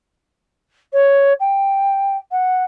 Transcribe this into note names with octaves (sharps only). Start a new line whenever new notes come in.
C#5
G5
F#5